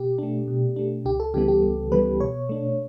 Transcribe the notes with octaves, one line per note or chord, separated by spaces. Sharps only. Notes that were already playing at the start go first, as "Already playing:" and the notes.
Already playing: B2 G4
A3 D4
B2
A3 D4
C#2 G4
A4
C#3 E3 G3 B3 G4
G4
C#2
C#3 E3 G3 B3 B4
B2 C#5
A3 D4